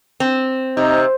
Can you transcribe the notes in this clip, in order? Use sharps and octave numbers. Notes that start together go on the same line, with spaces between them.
C4
C3 D#4